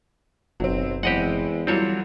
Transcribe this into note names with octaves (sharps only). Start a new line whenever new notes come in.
F#1 B1 F#3 C4
E2 G#3 B3 C4 G4 D#5 F#5
E3 F#3 G3 C4 F4 A4 C#5